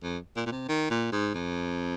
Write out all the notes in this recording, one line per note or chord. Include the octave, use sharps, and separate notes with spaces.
F2
A#2
A#2
C3
D#3
A#2
G#2
F2